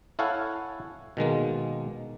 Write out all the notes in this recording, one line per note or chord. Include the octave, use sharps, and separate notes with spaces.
E4 A4 C#5 F5 F#5 G#5
B2 D#3 G#3 A#3